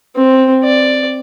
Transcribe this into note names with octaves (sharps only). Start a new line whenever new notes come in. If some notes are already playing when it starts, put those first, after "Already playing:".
C4
D5